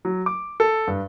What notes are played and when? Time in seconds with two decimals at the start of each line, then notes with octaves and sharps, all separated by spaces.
0.05 F#3
0.26 D6
0.60 A4
0.87 G2